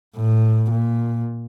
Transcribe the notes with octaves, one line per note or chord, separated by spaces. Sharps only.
A2
A#2